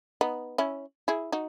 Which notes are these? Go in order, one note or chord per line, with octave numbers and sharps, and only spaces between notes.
B3 D#4
C#4 E4
E4 G#4
D#4 F#4